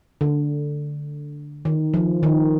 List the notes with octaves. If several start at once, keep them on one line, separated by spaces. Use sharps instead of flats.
D3
D#3
F3
D#3